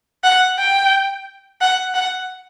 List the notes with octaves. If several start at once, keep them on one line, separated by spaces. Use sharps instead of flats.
F#5
G5
F#5
F#5